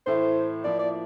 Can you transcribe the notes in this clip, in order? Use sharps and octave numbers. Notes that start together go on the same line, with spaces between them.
A2 E3 A3 E4 C5
F3 A#3 E4 D5
D5